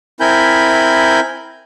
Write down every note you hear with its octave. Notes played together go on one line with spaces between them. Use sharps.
C4 E4 A#4 G#5 B5 G6